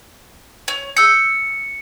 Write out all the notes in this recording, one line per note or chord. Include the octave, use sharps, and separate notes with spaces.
C#5
D#6 E6 G6 C#7